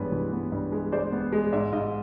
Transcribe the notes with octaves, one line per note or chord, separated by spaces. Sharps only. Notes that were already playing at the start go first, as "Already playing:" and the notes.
Already playing: G2 E3 G#3 B3 B4 C#5
E3
B3
G2
G#3
G#3 C5 D5
B3
G#3
G#2 D5 E5
G#2 D#5 F5